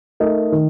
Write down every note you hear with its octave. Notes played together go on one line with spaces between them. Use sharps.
A3 D#4 A#4 D#5
D#3